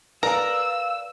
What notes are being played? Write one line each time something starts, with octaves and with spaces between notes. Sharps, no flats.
A#4 B4 D5 F5 A#5 E6